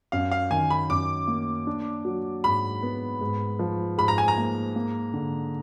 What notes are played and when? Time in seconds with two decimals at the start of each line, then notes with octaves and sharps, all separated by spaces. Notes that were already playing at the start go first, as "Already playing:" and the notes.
0.12 F#2 F5
0.32 F5
0.51 D#3 G#5
0.70 B5
0.90 F#2 D6
1.28 A#3
1.67 D4
2.05 F#3
2.44 G#2 B5
2.83 B3
3.21 G#2
3.59 F3
3.98 G#2 B5
4.08 A#5
4.18 G#5
4.28 A#5
4.38 A#3
4.76 A#3
5.14 D3